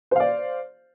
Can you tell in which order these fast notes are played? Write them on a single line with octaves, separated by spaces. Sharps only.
C5 F5 D5